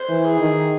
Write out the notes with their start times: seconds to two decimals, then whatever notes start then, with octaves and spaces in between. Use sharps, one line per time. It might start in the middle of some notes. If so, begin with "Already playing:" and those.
Already playing: C5
0.09 E3
0.25 G#4
0.40 D#3